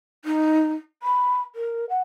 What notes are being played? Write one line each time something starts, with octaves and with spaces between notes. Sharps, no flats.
D#4
B5
A#4
F#5